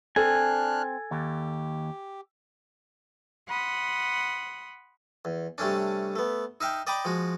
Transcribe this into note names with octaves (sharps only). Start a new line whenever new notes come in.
C4 D4 A4 G#5 F6 F#6
D#2 G4
F#5 B5 C6 D#6
E2
C3 G3 A3 C#4 D4
A3 B3
D#4 E5 F5 G5
D5 D#5 G5 A#5 B5 D6
F3 G#3 F#4